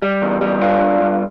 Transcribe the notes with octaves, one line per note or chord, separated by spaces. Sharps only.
G3
E2
G3
G2 D4 F4
G2
G2